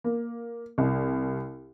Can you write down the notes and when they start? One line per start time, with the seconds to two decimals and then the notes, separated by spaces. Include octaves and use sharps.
0.04 A#3
0.78 C2